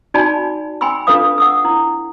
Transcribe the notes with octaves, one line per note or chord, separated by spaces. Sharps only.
D#4 F#4 D5 G#5 A5 B5
G5 G#5 B5 C6 E6
D4 F4 A4 B4 F5 D#6
F#5 D#6 E6
E4